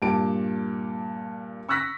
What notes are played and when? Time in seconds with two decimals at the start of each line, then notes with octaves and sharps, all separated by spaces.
0.02 G2 A#2 G4 A5 D7
1.69 C#6 E6 F#6 A#6 B6